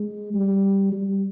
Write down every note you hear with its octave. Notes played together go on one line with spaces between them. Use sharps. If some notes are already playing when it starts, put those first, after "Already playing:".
Already playing: G#3
G3
G3